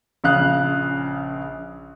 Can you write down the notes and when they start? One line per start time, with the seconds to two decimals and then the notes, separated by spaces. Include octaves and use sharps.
0.24 A#1 C#3 F5 D#6 F#6